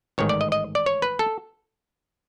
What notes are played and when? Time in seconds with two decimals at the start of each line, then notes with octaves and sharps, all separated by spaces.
0.18 A1 G#2 D#3 C#5
0.29 D5
0.41 D#5
0.52 D#5
0.75 D5
0.86 C#5
1.02 B4
1.19 A4